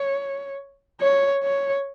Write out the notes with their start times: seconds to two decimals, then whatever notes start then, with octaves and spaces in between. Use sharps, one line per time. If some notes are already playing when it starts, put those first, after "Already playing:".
Already playing: C#5
1.00 C#5
1.43 C#5